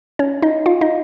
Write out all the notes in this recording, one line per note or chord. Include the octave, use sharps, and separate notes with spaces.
C#4 C#5
D#4 D#5
F4 F5
D#4 D#5